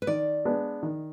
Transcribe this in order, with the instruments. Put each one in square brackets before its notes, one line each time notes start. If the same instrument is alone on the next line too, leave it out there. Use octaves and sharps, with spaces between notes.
[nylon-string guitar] B4
[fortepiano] D#3 [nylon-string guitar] D5
[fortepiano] G#3 B3 D4
D#3